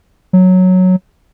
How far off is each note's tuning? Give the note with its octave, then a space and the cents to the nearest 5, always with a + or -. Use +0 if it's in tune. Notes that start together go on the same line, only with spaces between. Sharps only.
F#3 -5